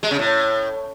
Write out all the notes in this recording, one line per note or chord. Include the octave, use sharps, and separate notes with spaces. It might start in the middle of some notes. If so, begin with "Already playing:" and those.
G#3
C#3
A2